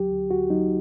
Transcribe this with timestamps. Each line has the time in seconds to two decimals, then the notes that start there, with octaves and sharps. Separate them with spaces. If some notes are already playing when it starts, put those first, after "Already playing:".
Already playing: D2 F#3 G4
0.11 D2
0.31 D2 F#4
0.50 F#3 D#4